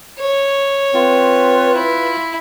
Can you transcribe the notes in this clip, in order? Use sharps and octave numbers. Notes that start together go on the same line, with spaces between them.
C#5
C4 F4 B4
E4